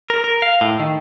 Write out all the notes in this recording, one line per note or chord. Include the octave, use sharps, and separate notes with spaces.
A#4
A#4
F5
A2
D#3